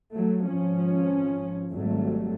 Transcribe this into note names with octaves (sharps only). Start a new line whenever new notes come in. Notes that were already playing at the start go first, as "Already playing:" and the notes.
F#3 A3
G#1 F3 C#4
G#1 F#3 G3 A3